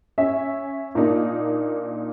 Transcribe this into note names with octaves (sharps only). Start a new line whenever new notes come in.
C#4 E5
A#2 A#3 D4 D#4